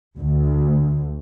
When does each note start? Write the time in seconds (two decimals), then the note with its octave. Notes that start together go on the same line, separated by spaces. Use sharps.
0.18 D2